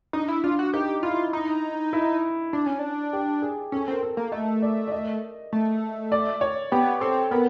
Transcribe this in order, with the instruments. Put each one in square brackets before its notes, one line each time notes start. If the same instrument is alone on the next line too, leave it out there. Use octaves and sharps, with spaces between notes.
[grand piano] D4 [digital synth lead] D#4
[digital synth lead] E4
[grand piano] D4 [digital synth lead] F4
[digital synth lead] F#4
[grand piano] D#4 [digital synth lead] G4
[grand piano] E4 [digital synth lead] F4
[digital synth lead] D#4
[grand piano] E4
[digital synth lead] D4
C#4
D4
[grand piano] G4
G#4
[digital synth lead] C#4 [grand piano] A4
[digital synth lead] C4 [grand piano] A#4
[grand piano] A4
[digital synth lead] A#3
[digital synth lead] A3 [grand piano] D#5
[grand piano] D5
D5
D#5
[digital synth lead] A3
[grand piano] D5
C#5
[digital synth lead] B3 [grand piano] G4
[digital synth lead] C4 [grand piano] A4
[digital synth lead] B3 [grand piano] A#4